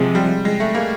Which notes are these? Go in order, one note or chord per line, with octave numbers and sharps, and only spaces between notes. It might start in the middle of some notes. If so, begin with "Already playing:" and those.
Already playing: C3 F3 G#3
G3
G#3
A3
A#3